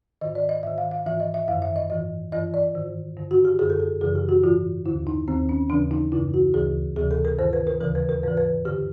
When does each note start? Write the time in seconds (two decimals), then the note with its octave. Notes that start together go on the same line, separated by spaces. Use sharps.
0.21 G#2 D#3 D#5
0.35 D5
0.49 D#5
0.63 G#2 D#3 E5
0.78 F5
0.91 F5
1.06 G#2 E3 E5
1.20 D#5
1.34 E5
1.48 F#2 D#3 F5
1.62 E5
1.76 D#5
1.90 G#2 E3 D#5
2.32 G2 E3 D#5
2.54 D5
2.75 G#2 D#3
3.17 G2 D3
3.31 F#4
3.45 G4
3.59 F#2 D3 G#4
3.70 A4
3.80 G#4
4.01 F#2 C#3 E3 G#4
4.15 G4
4.29 F#4
4.43 G#2 E3 F4
4.86 D#2 D3 E4
5.07 D#4
5.28 D#2 D#3 C4
5.49 C#4
5.70 D#2 C#3 E3 D4
5.91 D#4
6.12 F#2 C#3 E3 E4
6.34 F#4
6.54 D2 C#3 E3 G#4
6.96 D2 C3 E3 G#4
7.11 A4
7.25 A#4
7.39 G2 D#3 C5
7.53 B4
7.67 A#4
7.81 D#2 C#3 E3 A#4
7.95 B4
8.09 A#4
8.23 G#2 E3 B4
8.37 B4
8.65 G2 D3 G4